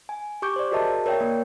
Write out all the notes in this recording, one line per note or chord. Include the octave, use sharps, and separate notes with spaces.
G#5
G4 C#6 D6 G6
C5 D5
F#4 G#4 A#4 D#5 E5 A5
A#4 C#5 D5 E5 G5
A#3